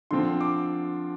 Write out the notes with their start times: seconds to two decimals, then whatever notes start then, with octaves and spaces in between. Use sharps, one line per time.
0.11 D3 F3 C4 C6
0.41 D6